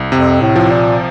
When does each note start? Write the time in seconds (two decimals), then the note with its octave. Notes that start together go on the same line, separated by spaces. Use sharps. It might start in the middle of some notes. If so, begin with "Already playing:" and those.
Already playing: C2
0.12 F2 C3
0.41 A2
0.56 F3
0.71 A#2